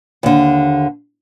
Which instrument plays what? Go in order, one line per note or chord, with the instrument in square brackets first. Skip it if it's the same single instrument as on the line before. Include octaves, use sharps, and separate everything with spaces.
[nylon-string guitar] D#2 D3